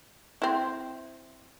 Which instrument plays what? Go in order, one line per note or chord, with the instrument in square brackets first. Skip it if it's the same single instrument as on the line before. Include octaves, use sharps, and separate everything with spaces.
[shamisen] C4 E4